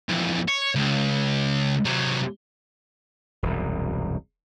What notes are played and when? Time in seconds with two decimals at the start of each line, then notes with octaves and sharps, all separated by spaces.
0.09 F2 E3
0.48 C#5
0.75 C#2
1.85 C3 F#3
3.43 E1 C2 F#2